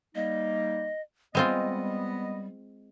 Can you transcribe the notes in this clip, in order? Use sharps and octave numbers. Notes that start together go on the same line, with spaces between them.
G3 A#3 D#4 D#5
G3 G#3 B3 C4 F4 D#5